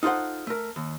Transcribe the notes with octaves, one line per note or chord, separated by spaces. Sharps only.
D#4 F4 A4 C5 F#5
A3 A#4
D#2